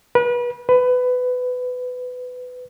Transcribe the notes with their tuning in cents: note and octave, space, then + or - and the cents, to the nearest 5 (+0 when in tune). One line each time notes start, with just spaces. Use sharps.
B4 -30
B4 +20